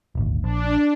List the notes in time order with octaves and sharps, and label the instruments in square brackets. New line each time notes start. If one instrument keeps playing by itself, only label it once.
[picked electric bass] D#1 G#1 D2
[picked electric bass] A#1 [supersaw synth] D4